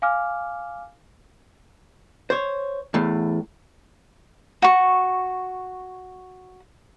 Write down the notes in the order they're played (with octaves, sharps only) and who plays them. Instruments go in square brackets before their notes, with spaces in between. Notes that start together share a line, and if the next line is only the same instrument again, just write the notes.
[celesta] F5 G#5 D6 F6
[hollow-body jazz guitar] C5 C#5
E2 A2 A3
[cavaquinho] F#4 C#6